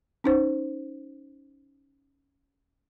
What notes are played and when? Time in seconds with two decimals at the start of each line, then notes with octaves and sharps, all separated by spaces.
0.24 C#4 D#4 C5